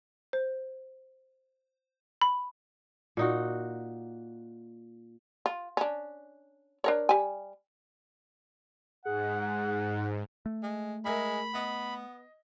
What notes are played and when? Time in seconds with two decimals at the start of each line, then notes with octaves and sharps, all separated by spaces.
0.33 C5
2.22 B5
3.17 A#2 D#4 F#4
5.46 F4
5.77 C#4 D4
6.84 D4 A#4 C#5
7.09 G3 G#5
9.05 G#2 G#4 F#5
10.46 A3
10.63 G#3
11.05 G#3 G#4 A#4 E5 B5
11.54 B3 D#5